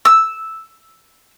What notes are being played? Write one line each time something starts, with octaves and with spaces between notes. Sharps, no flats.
E6